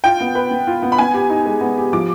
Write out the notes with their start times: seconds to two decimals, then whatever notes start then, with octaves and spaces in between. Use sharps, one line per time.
0.04 F4 G5
0.21 B3
0.35 B4
0.51 B3
0.67 F4
0.83 B3
0.92 B5
0.98 B3 G#5
1.14 G4
1.30 D#4
1.46 G#3
1.61 B3
1.78 G4
1.93 F3 D6